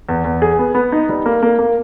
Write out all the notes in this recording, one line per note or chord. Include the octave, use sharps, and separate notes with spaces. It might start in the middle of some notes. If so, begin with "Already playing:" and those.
E2
E2
G#4
B3
B3
D#4
G3
A#3
A#3
A#3